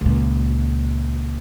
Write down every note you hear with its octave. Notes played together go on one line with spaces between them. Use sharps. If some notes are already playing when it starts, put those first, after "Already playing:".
C#2 A#2